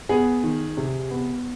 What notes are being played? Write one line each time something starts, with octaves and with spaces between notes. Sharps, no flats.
B3 G#4
D#3
C3
B3